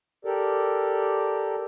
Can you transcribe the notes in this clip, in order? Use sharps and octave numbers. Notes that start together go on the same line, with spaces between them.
G4 A4 A#4 D5